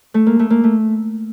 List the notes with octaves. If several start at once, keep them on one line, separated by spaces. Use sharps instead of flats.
A3
A#3
A3
A#3
A3